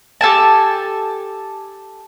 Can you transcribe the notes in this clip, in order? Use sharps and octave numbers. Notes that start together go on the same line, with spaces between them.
G4 A4 G#5 A5